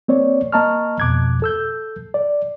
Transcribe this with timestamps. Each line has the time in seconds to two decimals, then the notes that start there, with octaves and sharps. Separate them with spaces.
0.08 A#3 C4 C#5 D5
0.52 A#3 D#5 A5 A#5 C#6 F6
1.00 F2 B2 D6 F#6 G#6
1.42 A4 E6 G6
2.14 D5